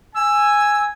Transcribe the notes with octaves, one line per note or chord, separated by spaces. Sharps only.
G#5 E6